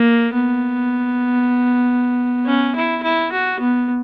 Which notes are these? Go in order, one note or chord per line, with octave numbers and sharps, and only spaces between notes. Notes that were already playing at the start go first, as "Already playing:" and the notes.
Already playing: A#3
B3
C#4
E4
E4
F#4
B3